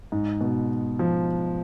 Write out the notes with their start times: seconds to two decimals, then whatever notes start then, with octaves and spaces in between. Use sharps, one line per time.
0.12 G#2
0.41 B2
0.99 F3